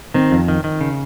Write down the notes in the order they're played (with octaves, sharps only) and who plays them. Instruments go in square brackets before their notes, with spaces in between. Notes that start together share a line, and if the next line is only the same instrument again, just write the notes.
[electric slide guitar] D#3 [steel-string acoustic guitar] C4
[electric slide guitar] F2
D#3
D#3
C#3